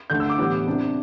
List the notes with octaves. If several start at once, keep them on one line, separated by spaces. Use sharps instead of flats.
D3 A3 D4 G6
E6
D6
A2 E3 G3 B3 E4
C3 G3 D4